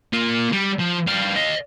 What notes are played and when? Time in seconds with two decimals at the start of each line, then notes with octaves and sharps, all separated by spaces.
0.13 A#3 F4
0.53 G3
0.79 F3
1.07 G3 F5
1.36 D#5 F5